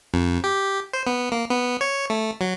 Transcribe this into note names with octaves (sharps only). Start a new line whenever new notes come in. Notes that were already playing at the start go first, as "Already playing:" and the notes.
F2
G4
C5
B3
A#3
B3
C#5
A3
F#3